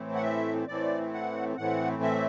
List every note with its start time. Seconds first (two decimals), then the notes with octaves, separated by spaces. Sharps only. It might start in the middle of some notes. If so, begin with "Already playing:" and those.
Already playing: A2 E3 A3 C4
0.15 F#5
0.22 E5
0.68 A2 E3 A3 C4 D5
1.13 F#5
1.57 A2 E3 A3 C4 F#5
2.02 E5